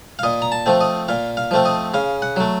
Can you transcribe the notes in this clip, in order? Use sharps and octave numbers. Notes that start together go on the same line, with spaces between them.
F5
A#2 D#5
A#5
A5
F3 A3 C4
D#5
A#2 F5
F5
F3 A3 C4
D#5
C#3 F5
F#5
F#3 A3